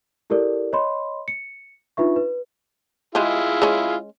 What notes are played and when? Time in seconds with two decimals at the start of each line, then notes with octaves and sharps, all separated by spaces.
0.30 E4 G4 A4 A#4 D5
0.73 C#5 D#5 B5 C6
1.28 C#7
1.97 D4 D#4 F4 B4 E5 C#6
2.16 B4
3.15 G#3 E4 F4 G4 G#4
3.62 G#3 C#4